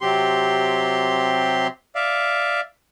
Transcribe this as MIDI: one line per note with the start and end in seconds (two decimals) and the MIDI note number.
0.01 1.67 48
0.01 1.67 54
0.01 1.67 60
0.01 1.67 67
0.01 1.67 84
1.95 2.61 74
1.95 2.61 76
1.95 2.61 77